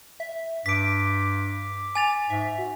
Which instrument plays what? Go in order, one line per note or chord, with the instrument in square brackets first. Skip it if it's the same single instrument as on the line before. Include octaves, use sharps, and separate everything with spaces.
[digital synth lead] E5
[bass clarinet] G2 [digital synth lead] D6 [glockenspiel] B6 D7
[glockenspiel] G#5 A6 F7
[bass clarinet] G#2 [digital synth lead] E5
[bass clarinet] F#4